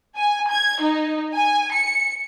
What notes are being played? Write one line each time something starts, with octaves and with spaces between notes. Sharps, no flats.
G#5
G#6
D#4
G#5
C#7